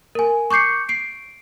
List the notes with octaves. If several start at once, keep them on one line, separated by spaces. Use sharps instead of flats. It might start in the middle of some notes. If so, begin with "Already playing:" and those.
A#4 G#5
C#6 D6 G6 C7 C#7
C7 D7